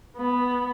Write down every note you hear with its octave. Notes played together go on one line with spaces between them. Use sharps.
B3